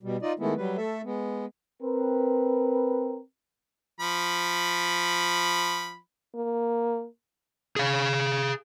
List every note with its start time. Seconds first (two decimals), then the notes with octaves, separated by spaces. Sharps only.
0.03 B2 G3
0.22 D#4 F4 D5 D#5
0.39 D#3 G#3 A3 B3 E4
0.57 F#3 G3 B4
0.77 A3 A4 E5
1.04 G#3 B3
1.82 C4 A#4 B4
4.00 F3 B5
6.35 A#3
7.76 G#4 F5